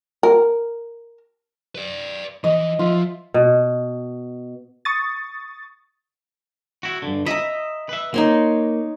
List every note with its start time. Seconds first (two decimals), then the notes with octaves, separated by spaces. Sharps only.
0.23 A#4
1.75 B4 D5
2.44 E3 D#5
2.79 F3 F4 E5
3.34 B2
4.85 C#6 D#6 A6
6.83 E4 F#4
7.02 G2 D3
7.26 D#5 E5 A#5 B5
7.89 B4 E5
8.14 A#3 D#4 C#5 C6